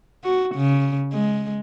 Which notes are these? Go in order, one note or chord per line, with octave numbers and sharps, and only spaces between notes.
F#4
C#3
G#3